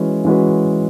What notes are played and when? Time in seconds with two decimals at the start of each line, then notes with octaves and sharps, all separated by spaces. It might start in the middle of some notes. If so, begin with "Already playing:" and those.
Already playing: E3 G#3 C#4 F#4 B4
0.25 E3 G#3 C#4 F#4 B4